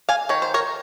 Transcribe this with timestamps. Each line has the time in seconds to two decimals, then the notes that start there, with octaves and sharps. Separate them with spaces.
0.09 F5 G#5
0.29 D#3 C#5
0.42 C5
0.54 A#4 C#5